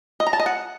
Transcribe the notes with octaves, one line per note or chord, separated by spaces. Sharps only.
D#5
A#5
A5
D#5
F#5